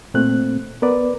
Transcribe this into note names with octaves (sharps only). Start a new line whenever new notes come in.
A#2 A3 C4 F#6
B3 A#4 B4 D5